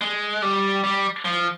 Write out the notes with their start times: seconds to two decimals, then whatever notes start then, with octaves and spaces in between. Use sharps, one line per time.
0.01 G#3
0.42 G3
0.84 G3
1.25 F3